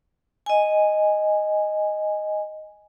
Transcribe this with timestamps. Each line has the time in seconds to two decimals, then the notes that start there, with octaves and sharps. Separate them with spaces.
0.46 D#5 G#5